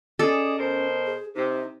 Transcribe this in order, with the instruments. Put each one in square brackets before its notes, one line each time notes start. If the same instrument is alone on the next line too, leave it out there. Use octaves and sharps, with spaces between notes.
[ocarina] C#4 [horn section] G#4 D5 D#5 [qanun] A4
[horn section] B2 A#4 C5
[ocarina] G#4
[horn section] C3 [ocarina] D#4